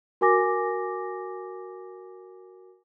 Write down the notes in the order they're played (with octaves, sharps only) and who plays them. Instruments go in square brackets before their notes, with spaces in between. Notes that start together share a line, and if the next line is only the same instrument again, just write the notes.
[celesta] F#4 A#4 G#5 D6 A#6